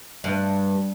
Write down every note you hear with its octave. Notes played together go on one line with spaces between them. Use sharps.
G2